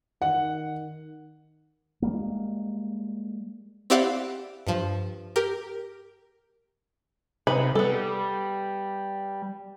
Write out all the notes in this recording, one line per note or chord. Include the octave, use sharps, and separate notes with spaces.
D#3 F#5
G3 G#3 A#3
C4 E4 G4 D5 F5 F#5
G2 F3
G4 A#4
C3 B3 D#4 B5
G3 B3 A4